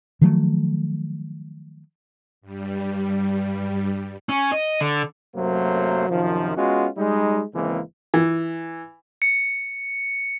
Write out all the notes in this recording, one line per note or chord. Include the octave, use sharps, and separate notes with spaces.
D#3 F3 F#3 A3
G2 G3
C#4
D#5
D3
F#2 C3 F#3 A3 A#3 C5
F#2 C3 D#3 F3
G#3 B3 C#4 F4 F#4
G3 G#3 D#4
G#1 C#3 E3 G#3 A#3 C4
E3
C#7